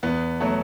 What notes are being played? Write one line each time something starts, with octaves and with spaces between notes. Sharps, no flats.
E2 B3
B2 F#3 A3